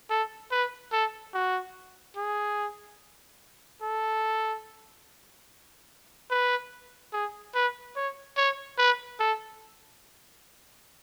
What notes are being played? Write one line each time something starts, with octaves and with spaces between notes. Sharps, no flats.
A4
B4
A4
F#4
G#4
A4
B4
G#4
B4
C#5
C#5
B4
A4